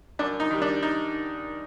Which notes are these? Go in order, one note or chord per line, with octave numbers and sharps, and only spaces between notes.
F#2 D4
D#4
D#3 G3
D4
D#4